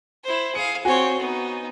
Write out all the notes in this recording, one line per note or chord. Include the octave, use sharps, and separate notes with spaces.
E4 C5
G#4 F5 C#7
C4 F#4 C#5 G#5
B3 D#4